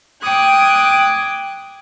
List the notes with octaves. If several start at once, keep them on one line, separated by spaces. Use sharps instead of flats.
G5 D6 D#6 F#6 G#6